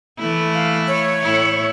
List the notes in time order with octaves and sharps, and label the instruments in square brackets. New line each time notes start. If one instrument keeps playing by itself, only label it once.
[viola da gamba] E3 A3 E4
[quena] F5
C#5
[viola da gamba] A2 E4